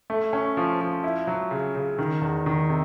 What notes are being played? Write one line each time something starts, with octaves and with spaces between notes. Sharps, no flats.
A3
C#4
F3
F3
E4
F#3
C#3
C#3
D#3
E2
D#3
C3